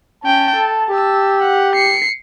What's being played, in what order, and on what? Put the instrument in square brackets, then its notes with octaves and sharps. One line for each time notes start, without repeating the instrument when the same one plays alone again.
[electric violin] C#4 G5 [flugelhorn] A5
[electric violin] A4
[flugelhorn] G4 [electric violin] A5 E6
[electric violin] F#5
C7 C#7